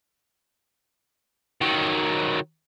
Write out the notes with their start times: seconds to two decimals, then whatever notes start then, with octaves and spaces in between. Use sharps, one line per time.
1.61 D#3 F#3